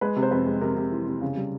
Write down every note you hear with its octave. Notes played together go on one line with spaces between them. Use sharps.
G#3 B4
C3
C5
F2 B4
G#3
C3 A#4
C3
E3
C3
C#3
G3